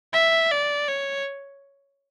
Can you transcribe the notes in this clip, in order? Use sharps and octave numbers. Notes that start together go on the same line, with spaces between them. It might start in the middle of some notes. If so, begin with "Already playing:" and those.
E5
D5
C#5